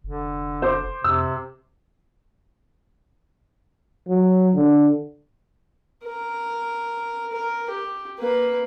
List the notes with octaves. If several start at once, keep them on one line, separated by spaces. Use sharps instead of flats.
F1 D3
C5 D6
F2 C3 E6
F#3
D3
A#4
A#4
G4
A#3 B4